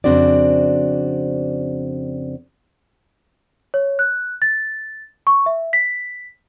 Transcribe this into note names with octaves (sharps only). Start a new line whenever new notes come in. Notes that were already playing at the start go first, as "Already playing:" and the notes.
F2 C#3 C4 D4 F#4 D5
C#5
F#6
A6
C#6
E5
B6